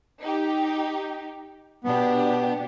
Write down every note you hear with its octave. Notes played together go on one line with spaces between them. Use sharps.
D#4 G4
B2 B3 D4 G4